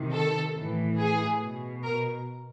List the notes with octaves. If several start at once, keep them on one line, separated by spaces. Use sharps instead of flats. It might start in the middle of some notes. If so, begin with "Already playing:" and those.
Already playing: C3 D#3
A4
A2 E3
G#4
B2
A#4